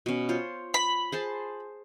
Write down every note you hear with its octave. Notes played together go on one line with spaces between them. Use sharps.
B2 C#4
F4 C5 C#5
B5
G#4 C5 A5